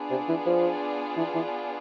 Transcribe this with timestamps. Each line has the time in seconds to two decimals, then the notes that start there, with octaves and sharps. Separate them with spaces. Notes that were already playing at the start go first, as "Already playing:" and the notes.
Already playing: B3 D4 F4 G#4 D5
0.11 C3
0.29 E3
0.46 F3
1.17 E3
1.35 E3